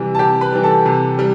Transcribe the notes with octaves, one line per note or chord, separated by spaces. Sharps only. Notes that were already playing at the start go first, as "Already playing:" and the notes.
Already playing: C3 E3 G3
A5
C3 G4 G5
B4 B5
E3 G3
A4 A5
C3
G3